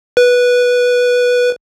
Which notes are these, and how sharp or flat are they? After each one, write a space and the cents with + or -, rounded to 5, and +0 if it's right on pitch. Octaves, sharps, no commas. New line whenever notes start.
B4 -10